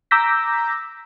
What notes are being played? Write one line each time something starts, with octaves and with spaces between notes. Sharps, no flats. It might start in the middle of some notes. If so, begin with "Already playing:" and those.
A#5 D6 E6 G6 A#6 B6